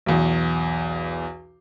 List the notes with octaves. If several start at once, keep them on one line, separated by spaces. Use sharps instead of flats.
B1 E2